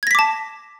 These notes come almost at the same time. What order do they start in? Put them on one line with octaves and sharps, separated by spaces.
G#6 A#6 B6 D6 A5